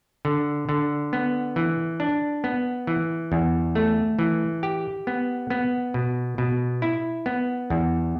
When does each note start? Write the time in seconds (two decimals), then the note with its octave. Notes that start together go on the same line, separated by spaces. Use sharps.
0.25 D3
0.69 D3
1.13 B3
1.56 E3
2.00 D4
2.44 B3
2.87 E3
3.32 E2
3.75 A3
4.19 E3
4.63 G4
5.07 B3
5.50 B3
5.94 B2
6.38 B2
6.82 E4
7.26 B3
7.70 E2